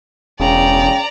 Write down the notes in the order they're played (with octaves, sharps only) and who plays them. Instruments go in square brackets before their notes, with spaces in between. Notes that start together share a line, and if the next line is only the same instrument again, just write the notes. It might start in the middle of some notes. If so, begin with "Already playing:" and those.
[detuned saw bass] E1 [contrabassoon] C#3 [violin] D5 A#5 [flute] G5